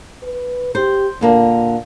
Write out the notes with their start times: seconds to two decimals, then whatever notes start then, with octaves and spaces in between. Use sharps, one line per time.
0.23 B4
0.75 G4 C5
1.21 A#2 D3 A#3 D4